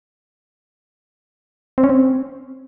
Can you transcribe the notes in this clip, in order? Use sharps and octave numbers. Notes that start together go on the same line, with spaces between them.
C4
C#4
C4